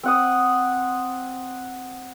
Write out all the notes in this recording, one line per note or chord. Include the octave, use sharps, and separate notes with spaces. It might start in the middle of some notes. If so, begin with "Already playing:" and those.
C4 F#5 D#6